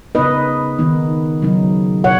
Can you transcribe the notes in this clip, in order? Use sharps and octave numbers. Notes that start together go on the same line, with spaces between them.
C#3 B3 D#4 B4 D#5
D#3 B3 D#4
C#3 F#3 D#4
B2 C#5 F#5